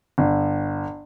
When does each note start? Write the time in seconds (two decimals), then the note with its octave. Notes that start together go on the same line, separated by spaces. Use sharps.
0.18 G1